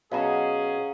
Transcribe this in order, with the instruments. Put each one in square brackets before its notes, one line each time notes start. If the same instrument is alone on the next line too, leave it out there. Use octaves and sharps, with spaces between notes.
[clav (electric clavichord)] B2 F#3 [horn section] C#4 G#4 [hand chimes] F5 F#5 A#5